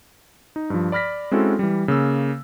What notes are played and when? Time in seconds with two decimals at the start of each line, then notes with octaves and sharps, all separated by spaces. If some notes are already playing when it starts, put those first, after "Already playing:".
0.56 D#4
0.70 G2 F3
0.92 D5 B5 F6 A#6 B6
1.31 G#3 C4 C#4 E4 F#4 A4
1.59 E3 G3
1.88 C#3 A#3 E6